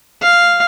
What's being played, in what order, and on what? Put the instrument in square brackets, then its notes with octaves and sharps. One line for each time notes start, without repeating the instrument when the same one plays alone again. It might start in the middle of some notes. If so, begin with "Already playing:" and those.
[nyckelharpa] F5